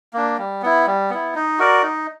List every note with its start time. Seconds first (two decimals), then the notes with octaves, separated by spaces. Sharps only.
0.13 A#3 D4
0.38 G3
0.62 B3 E4
0.86 G3
1.10 B3 E4
1.35 D#4
1.59 F#4 A#4 D5
1.83 D#4